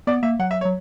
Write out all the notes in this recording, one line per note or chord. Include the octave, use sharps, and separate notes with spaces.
B3 D5
A#3 E5
F#3 F#5
E5
C#5
F#3